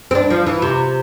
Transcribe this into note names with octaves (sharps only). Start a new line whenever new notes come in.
C4
D4
F3
E3
C3